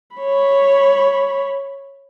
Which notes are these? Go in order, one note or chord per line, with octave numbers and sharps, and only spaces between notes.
C#5 B5